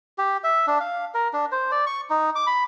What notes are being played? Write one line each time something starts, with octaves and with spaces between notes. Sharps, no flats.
G4
E5
D4
F5
A#4
D4
C5
D5
C#6
D#4
D6
B5